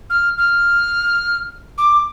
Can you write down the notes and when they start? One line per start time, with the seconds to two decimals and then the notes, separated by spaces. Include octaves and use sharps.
0.10 F6
0.38 F6
1.78 D6